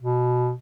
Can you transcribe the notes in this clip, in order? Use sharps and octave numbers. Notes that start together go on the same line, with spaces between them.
B2